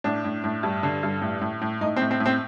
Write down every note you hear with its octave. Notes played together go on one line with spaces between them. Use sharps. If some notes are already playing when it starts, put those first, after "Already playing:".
A2 D4
A2
A2
G2
D3
G2
A2
A2
A2
A2 D#4
C4
A2
C4
A2
C4